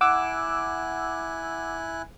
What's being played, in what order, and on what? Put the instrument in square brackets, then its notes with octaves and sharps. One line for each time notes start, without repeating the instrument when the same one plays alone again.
[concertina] E4 G#5 F#6 [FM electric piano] F#5 D6 E6